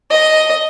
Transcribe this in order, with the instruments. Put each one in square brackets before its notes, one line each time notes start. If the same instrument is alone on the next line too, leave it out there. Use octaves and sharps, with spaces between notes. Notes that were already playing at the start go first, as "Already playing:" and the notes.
[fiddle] D#5